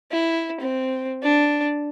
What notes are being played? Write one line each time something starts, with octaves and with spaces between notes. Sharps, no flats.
E4
C4
D4